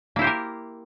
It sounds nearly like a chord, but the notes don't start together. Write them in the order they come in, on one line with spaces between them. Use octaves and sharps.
A#3 E4 C5 G4 A#4